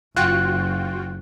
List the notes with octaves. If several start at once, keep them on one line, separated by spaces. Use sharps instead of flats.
F#1 F4 F#4 G5 F#6